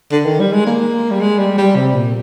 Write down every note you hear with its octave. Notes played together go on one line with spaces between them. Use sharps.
D3
D#3
G3
G#3
A#3
G3
G#3
G3
G3
C3
A#2